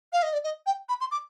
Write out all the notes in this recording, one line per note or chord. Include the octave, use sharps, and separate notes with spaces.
F5
D#5
D5
D#5
G5
B5
C6
D6